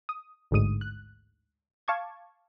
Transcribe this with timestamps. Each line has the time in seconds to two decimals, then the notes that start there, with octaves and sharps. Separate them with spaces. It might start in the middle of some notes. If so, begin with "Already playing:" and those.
0.09 D#6
0.51 A1 D2 G#2 D#6 D#7
0.81 F#6
1.88 F5 A5 C#6 D6 G#6